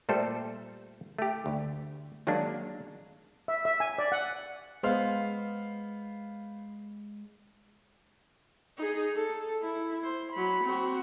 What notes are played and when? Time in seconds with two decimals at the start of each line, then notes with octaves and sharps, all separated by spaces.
0.09 A#2 G3 A3 A4 C5
1.18 A3 G4
1.46 D2
2.27 D#3 F#3 G#3 A#3 D4
3.48 E5
3.65 E5
3.80 G#5
3.98 D5
4.12 F#5
4.83 G#3 B3 C5 F5
8.78 D#4 G#4
9.16 A4
9.62 E4
10.04 C5
10.32 F#3 B5
10.65 C4 F#4